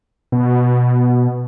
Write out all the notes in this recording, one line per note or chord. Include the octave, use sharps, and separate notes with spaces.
B2